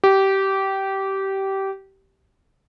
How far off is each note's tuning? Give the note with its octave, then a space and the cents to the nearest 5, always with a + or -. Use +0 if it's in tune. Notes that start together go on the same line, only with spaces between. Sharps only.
G4 -20